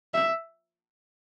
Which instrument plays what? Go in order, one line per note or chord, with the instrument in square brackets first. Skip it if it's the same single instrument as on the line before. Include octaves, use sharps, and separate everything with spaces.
[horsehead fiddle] E5